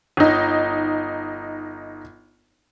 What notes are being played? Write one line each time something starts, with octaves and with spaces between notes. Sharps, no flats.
G1 D#4